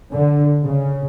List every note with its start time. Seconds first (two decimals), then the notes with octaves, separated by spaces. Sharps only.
0.11 D3
0.63 C#3